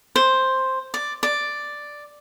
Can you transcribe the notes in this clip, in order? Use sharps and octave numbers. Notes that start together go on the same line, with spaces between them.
C5
D5
D5